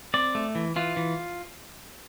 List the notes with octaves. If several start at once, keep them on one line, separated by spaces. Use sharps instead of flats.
C4 D5
A3
E3
E3 F4
E3